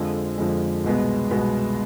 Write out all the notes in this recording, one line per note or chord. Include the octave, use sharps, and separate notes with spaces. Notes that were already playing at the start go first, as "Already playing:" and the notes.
Already playing: F2 D3 F3 G#3
F2 D3 F3 G#3
C2 B2 G#3 B3
C2 B2 G#3 B3